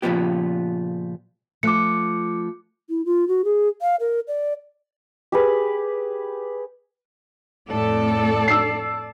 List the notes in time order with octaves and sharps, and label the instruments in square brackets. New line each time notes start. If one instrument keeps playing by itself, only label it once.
[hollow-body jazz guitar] A#2 C#3 E3 F3 B3 G4
[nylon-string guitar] F3 A3 [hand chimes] D6 F#6 C#7
[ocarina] E4
F4
F#4
G#4
F5
A#4
D5
[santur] G4 G#4 B4
[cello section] F2 A2 A4 [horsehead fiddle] D5 A5
[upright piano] E6 C7